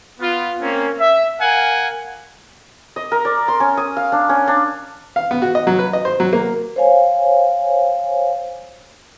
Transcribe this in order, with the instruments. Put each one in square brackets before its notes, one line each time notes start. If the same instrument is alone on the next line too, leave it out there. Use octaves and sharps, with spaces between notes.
[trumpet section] B3 F4
A#3 C4 C#4
E5
A#4 F5 F#5 G#5
[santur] D#5
A#4
D5
C6
C#4
D#6
F5
D4
C#4
D4
[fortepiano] F5
B3
F#4
D#5
F#3
B4
D#5
C5
F#3
A#3
[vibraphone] C5 C#5 F5 G#5